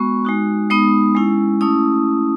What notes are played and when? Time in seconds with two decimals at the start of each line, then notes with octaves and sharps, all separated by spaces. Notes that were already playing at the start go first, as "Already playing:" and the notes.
Already playing: G#3 B3 F#4 C#6
0.25 G#3 D#4 F#4
0.70 G#3 B3 D#4 D#6
1.15 G#3 C#4 E4
1.61 A3 C#4 E4 D#6